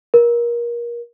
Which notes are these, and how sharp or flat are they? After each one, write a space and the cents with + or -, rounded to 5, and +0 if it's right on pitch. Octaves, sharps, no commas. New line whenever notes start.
A#4 +25